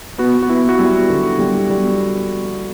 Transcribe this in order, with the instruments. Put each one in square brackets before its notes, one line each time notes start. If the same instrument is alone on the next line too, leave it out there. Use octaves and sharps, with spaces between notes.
[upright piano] B3 [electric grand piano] F#4
[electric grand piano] F#4
[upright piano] B3 [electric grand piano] E4
[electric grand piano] F#4
[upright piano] G3 [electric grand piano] E4
[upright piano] D3
G3
G3